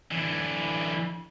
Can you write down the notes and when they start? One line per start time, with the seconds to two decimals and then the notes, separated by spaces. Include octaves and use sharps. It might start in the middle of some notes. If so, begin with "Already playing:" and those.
0.11 D3 E3